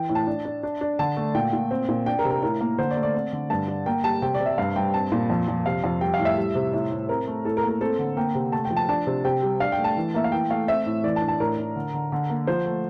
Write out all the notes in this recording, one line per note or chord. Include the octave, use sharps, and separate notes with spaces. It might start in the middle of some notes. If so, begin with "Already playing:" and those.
Already playing: E3 G5
A2
A5
D4
D4
D4
D4
D3 A5
A3
A#2 G5
A#2
C4
A#2
D4 G5
A#4
C3
A#4
A2 A#4
A#3
D3 C5
D5
A3
D5
C4
D3
G2 A5
D4
A#3 G5
G3 A5
C3 G5
D5
C3
E5
G2 F5
G2 G5
C4 A5
A#2
F2
F2
C3 F5
F2
G3 G5
F5
A2
E5
G3
C3
A2 E5
A2
C4 A#4
A3
A2 A4
A#4
A#3
A#4
C4 A4
D3
A#3 G5
C3
A3 A5
G5
F3
A5
D4 A5
C3
C3 G5
G3
D4 F5
G5
A3
A5
E3
A#3 E5
F5
E3 G5
A3 F5
C4 E5
A2
E3 D5
A5
D4
A5
A2 A#4
A2
D3
D3
D3
A#3
F3 C5
A3